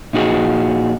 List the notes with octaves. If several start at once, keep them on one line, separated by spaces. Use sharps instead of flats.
A#2 D#4 F#4 G#4